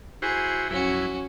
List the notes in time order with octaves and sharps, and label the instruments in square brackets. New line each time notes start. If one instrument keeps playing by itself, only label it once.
[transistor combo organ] E4 F#4 C5 [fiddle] G#4
[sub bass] A#1 [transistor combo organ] F#2 E4 [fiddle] C#4 F#4